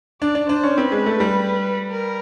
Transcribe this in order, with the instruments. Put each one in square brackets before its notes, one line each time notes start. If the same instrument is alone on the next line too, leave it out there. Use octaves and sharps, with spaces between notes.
[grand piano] D4 [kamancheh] D5
[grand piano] D4
[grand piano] D4 [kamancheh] C5
[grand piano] C#4
[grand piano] C4 [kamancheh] B4
[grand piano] G#3
A3
G3
[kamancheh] A#4